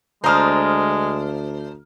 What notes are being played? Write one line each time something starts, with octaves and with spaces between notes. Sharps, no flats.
D2 G#3 D4 C5 A#5 D#6 F6